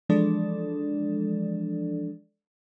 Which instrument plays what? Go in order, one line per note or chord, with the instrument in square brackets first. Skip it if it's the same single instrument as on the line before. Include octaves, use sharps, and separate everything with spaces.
[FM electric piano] E3 F3 G#3 D4 A4 D5